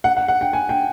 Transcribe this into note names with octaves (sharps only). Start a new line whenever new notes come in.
F#5
F#5
F#5
G5
G#5
G5